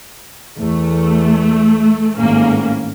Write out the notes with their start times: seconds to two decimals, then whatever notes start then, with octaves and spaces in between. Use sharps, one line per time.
0.58 E2 A3
2.17 G#1 A2 A#3 C#4